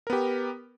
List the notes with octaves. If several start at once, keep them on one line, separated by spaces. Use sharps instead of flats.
B3 G4 A#4